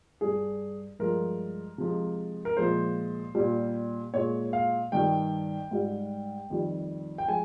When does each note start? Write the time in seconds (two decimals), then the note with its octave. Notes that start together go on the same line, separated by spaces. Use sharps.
0.21 G2 G3 G#4
0.99 G2 F3 G#3 A#4
1.78 C3 F3 G#3
2.45 A#4
2.57 A#2 F3 G#3 C5
3.35 A#2 G3
4.14 A#2 G#3 C#5
4.53 F5
4.92 G2 D#3 G3 G5
5.71 G#2 G3
6.50 F2 D#3 G3
7.18 G5
7.28 F3 G#3 G#5